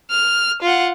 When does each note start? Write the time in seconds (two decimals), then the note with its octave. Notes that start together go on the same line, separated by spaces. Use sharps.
0.11 F6
0.62 F4 F#5